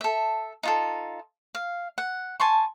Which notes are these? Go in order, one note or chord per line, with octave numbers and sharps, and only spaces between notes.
A4 E5
D#4 F4 A4
F5
F#5
G#5 A5 C6 C#6